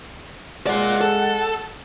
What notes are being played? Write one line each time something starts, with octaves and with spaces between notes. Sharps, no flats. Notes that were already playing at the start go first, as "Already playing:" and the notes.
G#3 F4 D5 F#5
A4